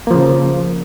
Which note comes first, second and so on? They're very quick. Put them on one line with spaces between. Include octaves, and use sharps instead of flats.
A#3 F3 C#3